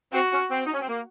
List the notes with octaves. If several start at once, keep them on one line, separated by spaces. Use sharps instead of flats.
C4 F#4
C#4
C4
D#4
C#4
C4
A#3